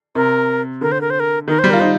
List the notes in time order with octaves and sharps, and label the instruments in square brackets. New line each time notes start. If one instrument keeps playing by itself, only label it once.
[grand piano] C3 [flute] A#4
[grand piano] D3 [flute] A#4
[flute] C5
A#4
C5
A#4
[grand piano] D#3 [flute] A#4
[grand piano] G3 [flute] C5
[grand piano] F4 [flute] A#4
[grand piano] D#4 [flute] C5